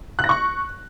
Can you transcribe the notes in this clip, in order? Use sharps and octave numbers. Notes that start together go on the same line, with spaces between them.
F#6
A#6
C#6